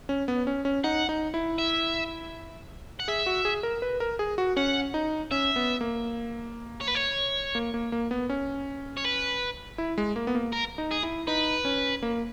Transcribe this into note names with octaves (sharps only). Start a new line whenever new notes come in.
C#4
B3
C#4
C#4
D#4 F#5
D#4
E4
E5
F#5
G#4 E5
F#4
G#4
A#4
B4
A#4
G#4
F#4
C#4 F#5
D#4
C#4 E5
B3
A#3
C#5
B4
C#5
A#3
A#3
A#3
B3
C#4
C#5
B4
E4
G#3
A#3
B3
A#3
A#4
D#4
G#4
E4
D#4 B4
C#4
A#3